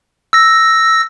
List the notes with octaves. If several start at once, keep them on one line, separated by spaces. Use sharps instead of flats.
E6 A#6